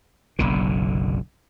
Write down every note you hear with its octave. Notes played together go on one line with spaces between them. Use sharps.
F#1 B1 D3